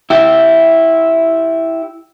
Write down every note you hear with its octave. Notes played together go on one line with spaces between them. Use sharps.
E4 G4